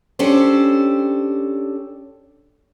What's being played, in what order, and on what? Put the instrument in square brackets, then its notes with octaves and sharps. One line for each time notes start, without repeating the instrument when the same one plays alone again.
[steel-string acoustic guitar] C#4 D4 G4 A4 C5